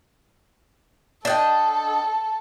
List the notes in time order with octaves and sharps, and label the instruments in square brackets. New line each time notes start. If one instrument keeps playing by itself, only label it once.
[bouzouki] D4 D#5 G5 [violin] A4